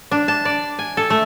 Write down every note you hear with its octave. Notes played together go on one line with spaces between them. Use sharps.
D4
A5
D5
G#5
A4
A3